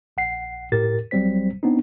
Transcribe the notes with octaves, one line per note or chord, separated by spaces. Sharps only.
A#1 F#5 C7
A2 G4 A#4 A6
G#1 F#3 G3 C4 C5 B6
B3 C4 D4 D#4